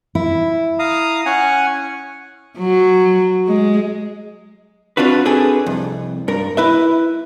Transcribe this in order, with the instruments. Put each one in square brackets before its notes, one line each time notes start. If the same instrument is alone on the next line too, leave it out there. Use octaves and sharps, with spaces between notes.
[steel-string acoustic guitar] E4
[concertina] F5 A#5 D#6
C#4 F#5 G#5
[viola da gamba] F#3
G#3
[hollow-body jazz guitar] C4 D4 F4 F#4 B4
C4 D4 G#4 A4 B4
C2 F2
G2 A#4
E4 B4 E5